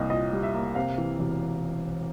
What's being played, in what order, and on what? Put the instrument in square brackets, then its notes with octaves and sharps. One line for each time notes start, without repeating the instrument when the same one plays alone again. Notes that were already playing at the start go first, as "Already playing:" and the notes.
Already playing: [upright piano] C2 G3 A#3 D#5
A#2 D#5
G3
E5
A#3
C3 F5
E3
E1